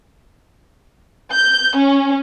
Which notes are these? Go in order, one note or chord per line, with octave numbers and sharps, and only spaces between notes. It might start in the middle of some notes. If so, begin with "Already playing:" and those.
G6
C#4